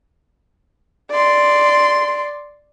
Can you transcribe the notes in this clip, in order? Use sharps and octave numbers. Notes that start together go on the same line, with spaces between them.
D5 C6